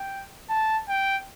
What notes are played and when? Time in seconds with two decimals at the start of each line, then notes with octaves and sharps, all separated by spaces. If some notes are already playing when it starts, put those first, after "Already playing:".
Already playing: G5
0.49 A5
0.89 G5